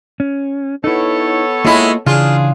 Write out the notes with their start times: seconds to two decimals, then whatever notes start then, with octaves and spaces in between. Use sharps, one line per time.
0.20 C#4
0.84 B3 D#4 E4 A4 C#5
1.65 G#3 A#3 E4 F4 D#5
2.06 C#3 E3 D4 F4 G#4